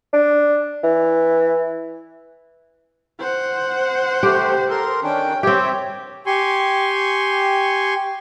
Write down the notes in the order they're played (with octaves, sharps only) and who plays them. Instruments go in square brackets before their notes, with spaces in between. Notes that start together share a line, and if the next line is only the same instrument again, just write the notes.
[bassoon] D4
E3
[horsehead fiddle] C5 F#5
[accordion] C3 A3 C4 [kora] G4
[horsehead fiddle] A4 [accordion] A#4 C6
[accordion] D#3 C#4 D4 [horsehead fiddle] G5
[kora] C4 G4 [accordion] C#5 E5
[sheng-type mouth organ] G4 G#5 C6 C#6